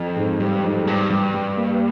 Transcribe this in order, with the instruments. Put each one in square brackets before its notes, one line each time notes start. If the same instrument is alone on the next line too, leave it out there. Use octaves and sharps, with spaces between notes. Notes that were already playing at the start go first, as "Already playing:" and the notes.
Already playing: [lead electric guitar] F2
[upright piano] G#2
[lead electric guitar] G2 [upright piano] G3
[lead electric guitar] F2 [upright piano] G#2
[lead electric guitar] G2 [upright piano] G3
[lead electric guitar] G2 [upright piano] G3
[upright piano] G3
A#3